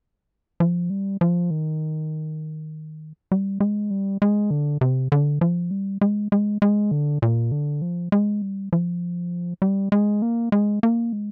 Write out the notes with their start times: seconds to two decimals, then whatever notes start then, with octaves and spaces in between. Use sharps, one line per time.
0.60 F3
0.90 G3
1.21 F3
1.51 D#3
3.32 G3
3.60 G#3
3.90 G3
4.22 G#3
4.51 D3
4.81 C3
5.12 D3
5.41 F3
5.71 G3
6.01 G#3
6.32 G#3
6.62 G#3
6.91 D3
7.22 A#2
7.52 D3
7.82 F3
8.12 G#3
8.42 G3
8.73 F3
9.62 G3
9.92 G#3
10.22 A#3
10.52 G#3
10.83 A#3
11.13 G#3